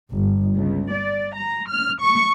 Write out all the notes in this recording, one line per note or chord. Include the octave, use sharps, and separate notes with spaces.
G1
C#2
D5
A#5
F6
C#6